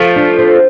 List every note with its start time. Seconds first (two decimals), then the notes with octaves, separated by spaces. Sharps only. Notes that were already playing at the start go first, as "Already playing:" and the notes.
Already playing: F3 A3
0.16 D4
0.39 C4